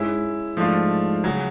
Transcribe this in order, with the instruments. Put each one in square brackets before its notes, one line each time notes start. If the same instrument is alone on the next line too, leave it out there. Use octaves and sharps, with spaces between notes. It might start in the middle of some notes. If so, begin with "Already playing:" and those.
Already playing: [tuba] G#2 [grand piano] G#3 C#4 E4 G#4
[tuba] G#2 [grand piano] F3 A3 D4 F4
[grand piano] C#3 F#3